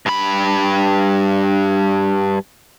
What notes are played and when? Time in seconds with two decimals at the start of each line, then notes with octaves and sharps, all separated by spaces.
0.06 G2 B5